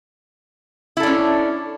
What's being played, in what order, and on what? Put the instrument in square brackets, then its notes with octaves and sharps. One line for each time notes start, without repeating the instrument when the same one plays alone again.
[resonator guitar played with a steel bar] E4
A4
D4
C#4